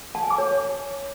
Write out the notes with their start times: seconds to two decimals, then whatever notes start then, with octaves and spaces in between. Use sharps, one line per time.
0.15 A5
0.23 G#5
0.30 D6
0.38 C#5